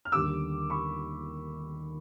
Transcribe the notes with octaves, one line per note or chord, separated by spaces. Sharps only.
F6
D#2 D3 G3 D6 E6
B5 C#6